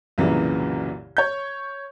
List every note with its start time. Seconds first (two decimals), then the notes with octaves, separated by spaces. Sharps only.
0.18 C2 F#2 A#2 C#3 E3 F#3
1.17 C#5 G6